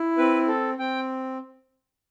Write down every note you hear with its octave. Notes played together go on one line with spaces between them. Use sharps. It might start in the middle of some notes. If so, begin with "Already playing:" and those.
Already playing: E4
C4 B4
A4
C4 G5